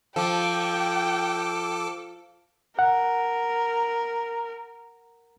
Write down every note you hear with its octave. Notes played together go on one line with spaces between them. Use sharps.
F3 A4 G5 D6
A#4 F#5